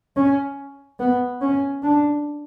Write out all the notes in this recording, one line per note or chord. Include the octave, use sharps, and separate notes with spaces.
C#4
B3
C#4
D4